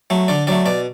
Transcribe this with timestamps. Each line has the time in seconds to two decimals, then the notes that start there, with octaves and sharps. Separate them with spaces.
0.10 F#3 A3
0.28 D3 D5
0.47 F#3 A3 D5
0.66 B2 D5